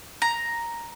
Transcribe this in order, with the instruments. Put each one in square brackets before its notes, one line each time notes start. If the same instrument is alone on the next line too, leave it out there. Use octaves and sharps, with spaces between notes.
[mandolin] A#5